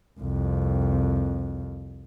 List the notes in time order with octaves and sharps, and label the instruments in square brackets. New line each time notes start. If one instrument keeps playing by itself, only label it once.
[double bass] C2 F2